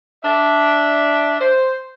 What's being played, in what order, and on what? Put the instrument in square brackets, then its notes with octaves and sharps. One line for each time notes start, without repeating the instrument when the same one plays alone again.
[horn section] D4 E5
C5